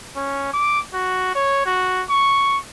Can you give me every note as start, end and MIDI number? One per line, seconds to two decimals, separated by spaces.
0.16 0.51 61
0.53 0.79 86
0.93 1.34 66
1.35 1.64 73
1.65 2.03 66
2.09 2.58 85